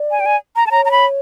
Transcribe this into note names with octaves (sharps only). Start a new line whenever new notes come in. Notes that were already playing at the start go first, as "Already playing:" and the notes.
Already playing: D5
G#5
G5
G#5
A#5
A5
C#5 A#5
A#5
B5